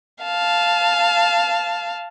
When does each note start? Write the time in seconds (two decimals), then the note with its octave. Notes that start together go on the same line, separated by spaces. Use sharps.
0.24 F5 A5